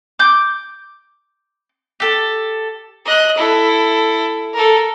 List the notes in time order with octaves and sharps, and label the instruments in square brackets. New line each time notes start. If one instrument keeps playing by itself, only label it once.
[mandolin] D6 G6
G4 A4
[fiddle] D#5 F#6
E4 A4
A4 A#4